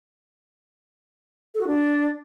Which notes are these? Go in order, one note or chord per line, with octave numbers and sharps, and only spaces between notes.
A4
F#4
D4